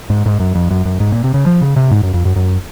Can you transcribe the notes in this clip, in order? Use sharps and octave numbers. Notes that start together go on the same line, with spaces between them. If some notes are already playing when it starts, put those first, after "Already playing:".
G#2
G#2
F#2
F2
F#2
F#2
G#2
A#2
C3
C#3
F3
C#3
C3
G#2
F#2
F2
F#2
F#2